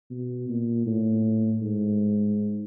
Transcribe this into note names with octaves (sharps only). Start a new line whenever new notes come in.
B2
A#2
A2
G#2